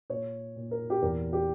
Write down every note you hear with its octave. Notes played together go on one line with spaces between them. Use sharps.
A#2 C#5
A#2
A#4
G4
E2 A#4
G4